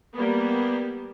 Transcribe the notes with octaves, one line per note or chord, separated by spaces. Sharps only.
G3 A#3 B3